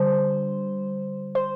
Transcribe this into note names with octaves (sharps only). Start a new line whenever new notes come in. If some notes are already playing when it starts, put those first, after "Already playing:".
Already playing: D3 G3 C5
C5